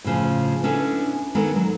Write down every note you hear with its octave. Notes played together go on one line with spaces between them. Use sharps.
A2 C#3 F3
B3 C#4 D4 E4 A4
D#3 G#3 B3 A4 A#4
F#3